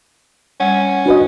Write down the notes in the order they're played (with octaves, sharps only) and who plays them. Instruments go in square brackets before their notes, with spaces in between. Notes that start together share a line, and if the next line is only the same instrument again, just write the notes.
[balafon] G3 F#5 [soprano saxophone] C#4
[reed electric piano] D4 B4 D#5 [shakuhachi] F#4